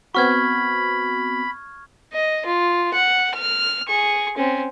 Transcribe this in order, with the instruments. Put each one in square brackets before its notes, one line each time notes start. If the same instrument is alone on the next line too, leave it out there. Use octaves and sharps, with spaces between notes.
[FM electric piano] B3 C4 F#4 [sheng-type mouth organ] B5 [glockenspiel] C#6 F6 G#6
[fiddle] D#5
F4
F#5
F6
G#4 C#6
C4 C#4